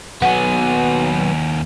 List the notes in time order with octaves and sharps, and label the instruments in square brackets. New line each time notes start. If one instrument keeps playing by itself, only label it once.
[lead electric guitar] D#2 G#5 [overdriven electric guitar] F#3 B3 [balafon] F#5